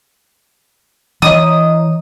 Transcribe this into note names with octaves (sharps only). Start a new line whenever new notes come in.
E3 C#5 D#5 A#5 D#6